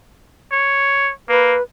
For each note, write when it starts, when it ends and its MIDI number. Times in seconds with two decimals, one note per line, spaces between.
0.52 1.12 73
1.29 1.56 58
1.29 1.62 71